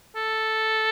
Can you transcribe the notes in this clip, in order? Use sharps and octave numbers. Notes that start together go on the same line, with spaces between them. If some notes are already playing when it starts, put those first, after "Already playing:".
A4